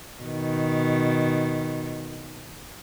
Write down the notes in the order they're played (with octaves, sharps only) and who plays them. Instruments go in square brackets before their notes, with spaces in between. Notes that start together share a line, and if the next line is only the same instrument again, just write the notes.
[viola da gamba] B2 D#3